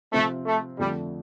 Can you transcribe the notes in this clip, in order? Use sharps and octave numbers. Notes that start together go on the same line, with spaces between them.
C3 F3 A3 C4 F4
A3
F2 D3 F3 G3 A3